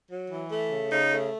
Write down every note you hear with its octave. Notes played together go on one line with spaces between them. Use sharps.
F#3
E3
A3
C#3
C#3 D#4
A3